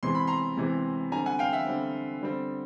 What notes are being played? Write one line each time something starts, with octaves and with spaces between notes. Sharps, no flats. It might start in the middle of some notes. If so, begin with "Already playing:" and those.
C3 E3 G#3 C4 C6
B5
A#5 C6
C3 E3 G#3 C4
D3 G3 C4 G#5 A#5
F#5 G#5
F5 G5
E5 F#5
D3 G3 C4
D3 G3 C4